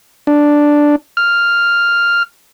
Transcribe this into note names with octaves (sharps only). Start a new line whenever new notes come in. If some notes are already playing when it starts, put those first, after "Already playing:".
D4
F6